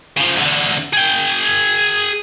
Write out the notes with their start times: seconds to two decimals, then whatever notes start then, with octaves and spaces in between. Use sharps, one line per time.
0.17 C#3 F3
0.36 E2 D3
0.93 G#4 G5